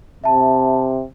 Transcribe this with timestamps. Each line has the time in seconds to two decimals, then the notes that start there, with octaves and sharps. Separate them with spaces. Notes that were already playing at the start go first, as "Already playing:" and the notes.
0.24 C3 E5 A5